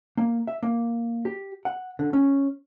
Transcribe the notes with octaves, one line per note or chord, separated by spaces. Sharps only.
A#3
E5
A#3
G4
F#5
D3
C#4